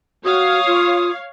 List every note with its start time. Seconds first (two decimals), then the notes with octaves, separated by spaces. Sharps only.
0.25 F#4 C#5 F5 D#6
0.67 F4